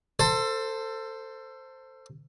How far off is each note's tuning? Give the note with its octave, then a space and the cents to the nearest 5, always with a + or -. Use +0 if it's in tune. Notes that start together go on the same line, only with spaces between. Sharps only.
A4 +25 C5 +0